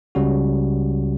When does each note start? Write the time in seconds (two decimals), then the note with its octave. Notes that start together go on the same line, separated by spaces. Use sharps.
0.15 C#2 C#3 G3 C#4 F#4